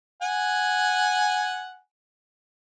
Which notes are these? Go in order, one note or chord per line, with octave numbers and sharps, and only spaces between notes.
F#5 G#5